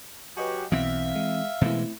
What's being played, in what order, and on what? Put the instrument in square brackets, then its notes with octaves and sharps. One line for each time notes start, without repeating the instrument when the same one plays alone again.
[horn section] F#3 F#4 G4 [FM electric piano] B4 D#5 G#5
[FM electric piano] B1 B2 B6 [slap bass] E3 C4 [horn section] E5 F5
[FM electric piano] G#3
[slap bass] B2 E3 G#3 [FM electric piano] A3 C4 E4